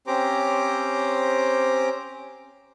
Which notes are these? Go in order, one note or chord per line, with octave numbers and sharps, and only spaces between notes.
C4 C#4 G4 C5 A#5 D6